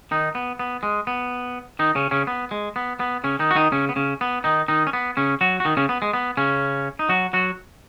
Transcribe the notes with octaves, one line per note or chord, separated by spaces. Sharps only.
D#3 D#4
B3
B3
G#3
B3
D#3 D#4
C#3 C#4
C#3 C#4
B3
G#3
B3
B3
C#3 C#4
D#3 D#4
F#4
D#3 D#4
C#3 C#4
B3
C#3 C#4
B3
D#3 D#4
D#3 D#4
C#4
B3
C#3 C#4
F#3 F#4
F#4
D#3 D#4
C#3 C#4
B3
G#3
B3
C#3 C#4
D#4
F#3 F#4
F#3 F#4